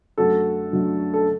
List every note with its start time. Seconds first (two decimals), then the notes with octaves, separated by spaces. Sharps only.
0.18 F#2 D3 F#3 A3 F#4 A4
0.72 F#2 D3 F#3 A3
1.14 A4